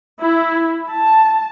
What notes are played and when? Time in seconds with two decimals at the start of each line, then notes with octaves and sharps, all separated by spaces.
0.20 E4
0.90 A5